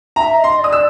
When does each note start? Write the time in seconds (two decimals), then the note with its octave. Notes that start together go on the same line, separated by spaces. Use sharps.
0.16 E5 A#5
0.37 D#5
0.44 C6
0.59 D5
0.64 D#6
0.73 E6